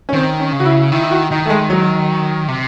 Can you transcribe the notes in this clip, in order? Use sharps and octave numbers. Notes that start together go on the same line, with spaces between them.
C#4
D#3 C4
C#4
C#3
F#4
E4
D#3 E4
E4
F#4
D#3 D#4
A3
G#3
F#3
C3